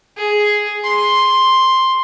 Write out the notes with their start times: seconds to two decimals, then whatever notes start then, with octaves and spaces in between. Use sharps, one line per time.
0.16 G#4
0.84 C6